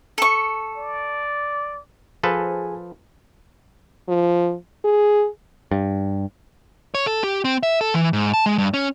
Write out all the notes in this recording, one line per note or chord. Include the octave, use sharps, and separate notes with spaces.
A4 C#6
D5
F3 G#4 A4 B4 C5 G#5
F3
G#4
G2
C#5
A4
G4
C4
E5
A4
E3
G#2
A5
G#3
G2
C#4